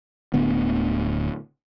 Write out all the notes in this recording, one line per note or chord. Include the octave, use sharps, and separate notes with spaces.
D1 D2 B3